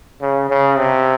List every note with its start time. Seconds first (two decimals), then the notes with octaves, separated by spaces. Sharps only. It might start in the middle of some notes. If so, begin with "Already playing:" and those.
0.21 C#3
0.49 C#3
0.77 C3